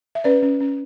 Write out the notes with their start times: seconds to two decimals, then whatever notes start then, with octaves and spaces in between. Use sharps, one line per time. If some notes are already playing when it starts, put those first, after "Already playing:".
0.15 E5
0.24 C#4 B4 D5
0.42 C#4
0.60 C#4